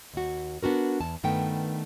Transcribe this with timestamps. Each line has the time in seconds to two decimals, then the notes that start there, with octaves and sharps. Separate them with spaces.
0.14 D#2 F#4
0.63 B3 D4 F#4 A#4
1.00 E2 A5
1.23 G2 D#3 A3 B3 G5